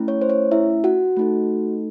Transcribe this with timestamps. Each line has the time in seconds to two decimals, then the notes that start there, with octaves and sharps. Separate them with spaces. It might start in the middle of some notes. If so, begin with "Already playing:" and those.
Already playing: A3 C#4 E4
0.08 C#5
0.22 C5
0.30 C#5
0.52 E4 E5
0.84 F#4 F#5
1.17 A3 D#4 A4